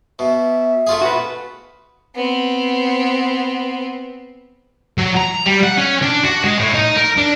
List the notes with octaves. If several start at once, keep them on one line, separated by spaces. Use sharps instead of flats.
B2 E5
A3 F4 G#4
F#4 B4
B3 C4
F#3
A#5
G3
F#5
C#4
D4
F#4
G#3
A2
D#4
A#4
D4